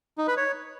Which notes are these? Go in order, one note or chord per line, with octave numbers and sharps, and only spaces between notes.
D#4
B4
C#5